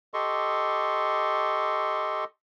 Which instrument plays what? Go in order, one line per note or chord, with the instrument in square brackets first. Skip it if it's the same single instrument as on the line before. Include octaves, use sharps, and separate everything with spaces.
[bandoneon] G4 A4 D#5 C6 C#6